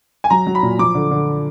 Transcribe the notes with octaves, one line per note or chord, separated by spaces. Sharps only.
G#5
F#3 A#5
F#3
B5
A#2
F3 D6
D3
D3